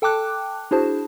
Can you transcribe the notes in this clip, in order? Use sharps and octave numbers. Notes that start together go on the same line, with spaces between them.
A4 G5 A5 D6 F#6
D4 E4 F#4 G#4 C5 A5